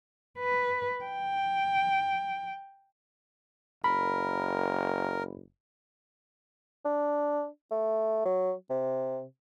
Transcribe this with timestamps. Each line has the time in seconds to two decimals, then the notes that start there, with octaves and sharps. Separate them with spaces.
0.39 B4
1.04 G5
3.84 F#1 A#4 B5
6.85 D4
7.71 A3
8.26 F#3
8.70 C3